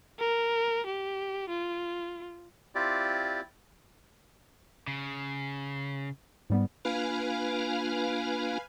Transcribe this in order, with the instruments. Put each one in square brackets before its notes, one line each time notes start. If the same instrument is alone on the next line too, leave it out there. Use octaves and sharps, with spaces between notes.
[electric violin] A#4
G4
F4
[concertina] C4 E4 F4 G4 D5
[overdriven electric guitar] C#3
[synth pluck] G#2 G3 B3
[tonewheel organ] A#3 D4 F4 [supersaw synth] B4 F5 G#5